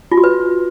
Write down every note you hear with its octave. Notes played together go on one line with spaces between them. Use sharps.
F4
F#4
B4